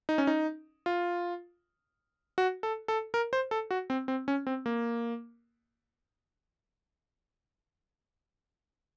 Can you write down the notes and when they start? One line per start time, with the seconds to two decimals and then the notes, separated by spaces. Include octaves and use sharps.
0.09 D#4
0.18 C#4
0.27 D#4
0.86 F4
2.38 F#4
2.63 A4
2.88 A4
3.14 A#4
3.33 C5
3.51 A4
3.71 F#4
3.90 C4
4.08 C4
4.28 C#4
4.47 C4
4.66 A#3